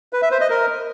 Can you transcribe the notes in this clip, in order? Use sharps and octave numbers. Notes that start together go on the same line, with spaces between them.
B4
E5
C5
D#5
A#4